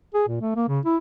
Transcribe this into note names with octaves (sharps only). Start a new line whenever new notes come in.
G#4
A#2
A3
A#3
C#3
E4